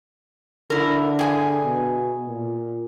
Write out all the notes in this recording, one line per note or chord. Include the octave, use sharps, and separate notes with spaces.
D3 E4 A#4
G#4 G5 G#5
B2
A#2